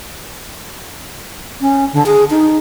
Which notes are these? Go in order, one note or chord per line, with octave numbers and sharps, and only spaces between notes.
C#4
D3
G#4
D#4